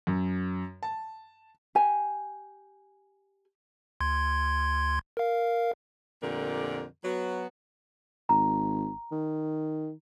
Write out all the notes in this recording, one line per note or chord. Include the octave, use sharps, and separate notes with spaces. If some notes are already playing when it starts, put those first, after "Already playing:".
F#2
A5
G4 G#5
D2 C6 G#6
A#4 F5
F2 A#2 D3 A3 G4 A#4
F#3 B3 F#4
G#1 A#5
D#3